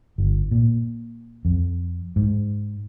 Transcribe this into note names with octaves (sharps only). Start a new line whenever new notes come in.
G1
A#2
F2
G#2